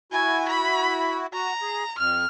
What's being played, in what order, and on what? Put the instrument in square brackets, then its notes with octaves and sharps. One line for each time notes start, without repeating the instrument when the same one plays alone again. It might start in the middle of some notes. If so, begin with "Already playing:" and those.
[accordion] E4 F#4 [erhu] G#5
[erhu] B5
[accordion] F#4 [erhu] A#5
[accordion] G#4
[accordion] F2 [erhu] F6